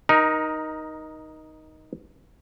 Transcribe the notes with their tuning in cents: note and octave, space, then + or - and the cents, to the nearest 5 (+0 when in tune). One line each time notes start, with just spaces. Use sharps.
D#4 +0 A#4 +25